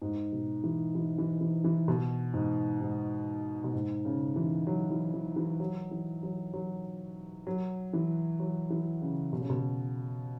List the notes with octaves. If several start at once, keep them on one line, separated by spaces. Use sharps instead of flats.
G#2
B2
E3
E3
E3
E3
E3
B2
G#2
G#2
B2
G#2
C#3
E3
F#3
E3
E3
E3
F#3
E3
F#3
F#3
F#3
E3
F#3
E3
C#3
B2
C#3
B2